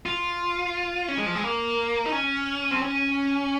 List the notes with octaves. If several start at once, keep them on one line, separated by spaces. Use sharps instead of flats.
F4
C#4
G#3
F3
G#3
A#3
D#4
C#4
C4
C#4